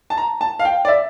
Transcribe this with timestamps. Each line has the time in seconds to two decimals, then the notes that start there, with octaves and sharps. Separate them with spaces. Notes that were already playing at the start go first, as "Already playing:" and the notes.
0.10 A5
0.18 A#5
0.41 A5
0.59 F5
0.65 G5
0.85 D5
0.88 E5